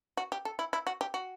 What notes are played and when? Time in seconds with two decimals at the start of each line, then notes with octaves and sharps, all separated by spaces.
0.17 F#4
0.32 G4
0.45 A4
0.59 E4
0.73 E4
0.87 F#4
1.01 G4
1.14 F#4